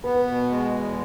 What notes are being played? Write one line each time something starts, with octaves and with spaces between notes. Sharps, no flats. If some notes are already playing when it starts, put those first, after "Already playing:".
B3 B4
B2
G#3
E2